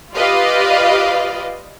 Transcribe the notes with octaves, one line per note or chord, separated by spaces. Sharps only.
F4 G4 B4 D5 D#5 F5